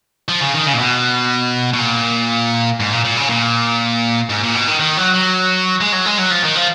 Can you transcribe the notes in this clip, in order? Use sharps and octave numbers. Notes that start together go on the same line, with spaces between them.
F3
C#3
D#3
C#3
A#2
B2
B2
A#2
G#2
A#2
A#2
C#3
A#2
G#2
A#2
B2
D#3
D#3
F#3
F#3
G#3
F#3
G#3
F#3
F3
D#3
F3